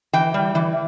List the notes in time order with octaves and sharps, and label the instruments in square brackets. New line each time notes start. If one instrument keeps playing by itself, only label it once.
[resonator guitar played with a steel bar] E3 G5
G3
E3